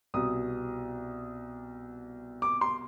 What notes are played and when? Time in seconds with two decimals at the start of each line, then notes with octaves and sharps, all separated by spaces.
0.14 C2 B2 D#6
2.42 D6
2.61 C6